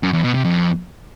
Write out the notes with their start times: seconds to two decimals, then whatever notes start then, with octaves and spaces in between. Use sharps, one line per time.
0.03 F#2
0.13 E2
0.24 B2
0.34 C3
0.44 F2